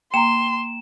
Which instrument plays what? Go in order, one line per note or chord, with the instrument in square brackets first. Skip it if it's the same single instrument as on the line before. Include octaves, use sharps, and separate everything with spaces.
[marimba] A#3 [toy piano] G5 A#5 [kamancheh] C6 [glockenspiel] E7